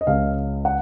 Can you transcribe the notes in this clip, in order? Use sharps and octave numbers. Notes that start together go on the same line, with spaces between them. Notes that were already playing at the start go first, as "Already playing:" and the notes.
D#5
C#2 C#3 F5
F#5